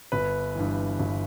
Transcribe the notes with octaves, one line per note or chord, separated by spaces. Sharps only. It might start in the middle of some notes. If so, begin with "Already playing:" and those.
G1 B4
G2 E3
G1